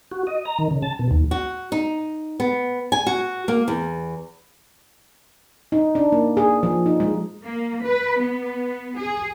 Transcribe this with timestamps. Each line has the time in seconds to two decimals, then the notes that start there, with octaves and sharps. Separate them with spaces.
0.11 F#4
0.27 D#5
0.45 A#5
0.59 D#3
0.71 C#3
0.83 A5
0.99 B2
1.11 D#2
1.31 F#4
1.72 D#4
2.40 B3
2.92 G#5
3.07 F#4
3.48 A#3
3.68 E2
5.72 D#4
5.95 D4
6.12 A#3
6.37 G#4
6.63 F3
6.86 D#4
7.00 G#3
7.44 A#3
7.85 B4
8.21 B3
9.00 G#4